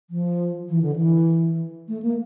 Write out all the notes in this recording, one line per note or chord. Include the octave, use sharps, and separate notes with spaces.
F3
E3
D3
E3
A3
A#3